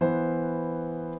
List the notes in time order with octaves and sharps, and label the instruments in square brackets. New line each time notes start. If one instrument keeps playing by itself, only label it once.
[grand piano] E3 B3 B4 C5